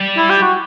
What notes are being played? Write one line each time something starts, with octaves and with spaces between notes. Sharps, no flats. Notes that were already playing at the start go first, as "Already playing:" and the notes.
Already playing: G3
E4
G4
F#4